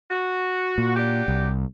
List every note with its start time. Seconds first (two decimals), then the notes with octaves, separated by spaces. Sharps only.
0.10 F#4
0.78 A#2
0.96 F#3 D4 G4
1.28 C2